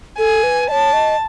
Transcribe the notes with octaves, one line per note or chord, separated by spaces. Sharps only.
A4 G#5
B4
C#5 D#5 A5
D#5